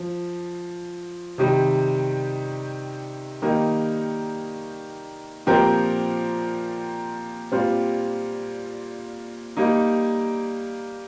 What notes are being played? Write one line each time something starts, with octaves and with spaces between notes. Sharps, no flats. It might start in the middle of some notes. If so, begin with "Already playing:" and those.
Already playing: F3
C3 D#3 G3
D#3 G3 A#3 D#4 A#4
A#2 F3 C4 G4 A#4
A#2 G3 C4 F4
G3 A#3 D#4